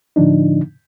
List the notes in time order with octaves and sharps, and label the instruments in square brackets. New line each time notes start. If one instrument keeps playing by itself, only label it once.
[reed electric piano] A2 D3 F3 D4 D#4